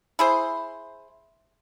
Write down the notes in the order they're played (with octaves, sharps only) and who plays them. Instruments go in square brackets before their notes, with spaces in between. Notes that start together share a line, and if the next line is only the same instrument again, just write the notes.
[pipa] E4 G#4 C5